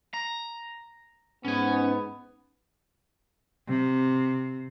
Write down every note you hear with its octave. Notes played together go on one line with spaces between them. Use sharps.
A#5
G#2 B3 C#4 G#5
C3